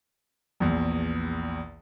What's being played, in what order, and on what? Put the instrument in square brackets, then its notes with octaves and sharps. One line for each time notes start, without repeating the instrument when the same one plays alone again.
[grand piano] A#1 E2